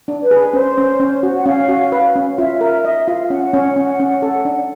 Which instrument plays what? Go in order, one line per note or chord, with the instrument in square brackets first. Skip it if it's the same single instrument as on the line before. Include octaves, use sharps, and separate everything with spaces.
[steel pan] D4
[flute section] B4
[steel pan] G#4
[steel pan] C#4 [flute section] C5
[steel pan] C#4
C#4
F#4
[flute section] F#5
[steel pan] C#4 [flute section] F5
[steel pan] F#4
B4
C#4
[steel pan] F4 [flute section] E5
[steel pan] A#4 [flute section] E5
[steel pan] D#5 [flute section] E5
[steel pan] F4 [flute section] F5
[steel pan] C#4 [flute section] F#5
[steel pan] C#4
C#4
C#4
A4
D4